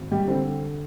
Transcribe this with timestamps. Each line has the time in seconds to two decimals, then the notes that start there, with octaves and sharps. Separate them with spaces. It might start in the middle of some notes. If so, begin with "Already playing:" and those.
Already playing: G#1
0.11 G3 G4
0.27 D3 C4